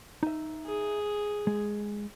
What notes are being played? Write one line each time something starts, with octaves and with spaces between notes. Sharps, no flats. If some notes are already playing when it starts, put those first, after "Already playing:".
D#4 E5
G#4
G#3